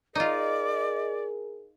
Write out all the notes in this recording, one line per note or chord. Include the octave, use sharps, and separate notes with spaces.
D#4 F4 G#4 A#4 D5 D#5